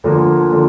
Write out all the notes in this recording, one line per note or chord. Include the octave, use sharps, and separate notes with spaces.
D2 D3 F3 A#3
D3 F3 A#3